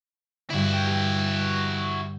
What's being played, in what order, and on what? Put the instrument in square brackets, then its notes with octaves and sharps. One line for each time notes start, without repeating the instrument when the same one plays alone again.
[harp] G2 D3 [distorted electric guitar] E4 F#4
[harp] G5
G4